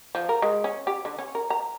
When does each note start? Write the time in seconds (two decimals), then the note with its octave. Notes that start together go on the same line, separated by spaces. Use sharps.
0.15 F3
0.29 A#4
0.42 G#3
0.64 C#4
0.87 G4
1.05 D3
1.19 C#4
1.35 A#4
1.50 A#5